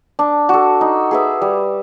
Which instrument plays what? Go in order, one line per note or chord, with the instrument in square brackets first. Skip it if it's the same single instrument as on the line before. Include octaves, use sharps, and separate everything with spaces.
[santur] D4
F#4 A4
D#4
G#4 B4 E5
G3